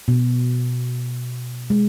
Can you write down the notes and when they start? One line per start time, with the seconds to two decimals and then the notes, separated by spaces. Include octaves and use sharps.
0.08 B2
1.70 G#3